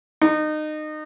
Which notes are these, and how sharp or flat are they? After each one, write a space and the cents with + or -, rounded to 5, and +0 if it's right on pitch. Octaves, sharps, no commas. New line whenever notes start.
D#4 -25